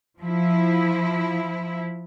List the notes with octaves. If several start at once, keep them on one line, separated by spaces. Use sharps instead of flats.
F3 E4